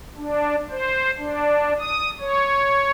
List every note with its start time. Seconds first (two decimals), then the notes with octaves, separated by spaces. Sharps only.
0.18 D4
0.71 C5
1.19 D4
1.79 D#6
2.20 C#5